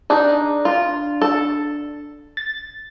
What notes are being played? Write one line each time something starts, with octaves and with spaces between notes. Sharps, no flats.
D4 D#4 G#4
F4
A4
A6